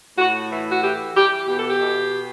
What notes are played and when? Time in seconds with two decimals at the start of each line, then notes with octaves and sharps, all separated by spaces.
0.18 A2 F#4
0.51 E3
0.71 F#4
0.82 E3 G4
1.15 E3 G4
1.47 B2 G4
1.57 A4
1.68 G4
1.80 B2